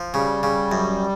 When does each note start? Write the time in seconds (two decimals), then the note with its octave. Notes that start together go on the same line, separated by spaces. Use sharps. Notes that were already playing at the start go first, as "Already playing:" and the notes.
Already playing: F3
0.14 C#3 G3
0.43 C#3
0.72 F#2